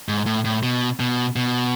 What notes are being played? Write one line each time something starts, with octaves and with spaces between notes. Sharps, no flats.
G#2
A2
A2
B2
B2
B2